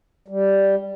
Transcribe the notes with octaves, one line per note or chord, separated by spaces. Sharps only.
G3